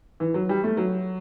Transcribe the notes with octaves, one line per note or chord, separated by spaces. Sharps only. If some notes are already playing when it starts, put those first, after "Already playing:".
E3
F#3
G3
A3
F#3